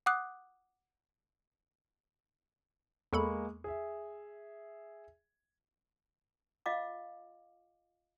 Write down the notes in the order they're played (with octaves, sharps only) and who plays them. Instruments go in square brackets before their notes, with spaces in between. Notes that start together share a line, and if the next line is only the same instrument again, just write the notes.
[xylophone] F#5 D6 D#6 F#6
[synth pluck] E2 A4 B5 [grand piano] G#3 A#3 C#6
[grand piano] G#4 E5
[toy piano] F4 D#5 F5 D6